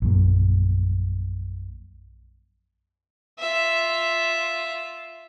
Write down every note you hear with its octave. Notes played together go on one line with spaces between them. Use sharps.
A#1 F#2 A#2
F4 E5